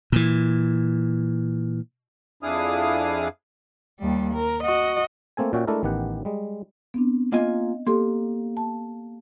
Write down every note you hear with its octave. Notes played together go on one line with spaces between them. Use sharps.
A#2 E3
F2 D4 E4 G#4 F5 D#6
D#2 G3
A#4
F#4 D#5
A3 A#3 C4 A4 G#5
A#2 C#4 F#4 E5 G5
G#3 A3 D4 E4 A4 A#4
A1 D#3 B3 G4 F#5
G3 G#3
B3 C4 D4
A#3 F4 D#5 G#5
A#3 G4 A4 C6
A5